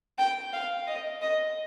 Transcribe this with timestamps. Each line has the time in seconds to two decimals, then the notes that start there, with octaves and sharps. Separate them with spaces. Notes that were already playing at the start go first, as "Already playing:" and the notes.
0.18 G5
0.53 F5
0.87 D#5
1.22 D#5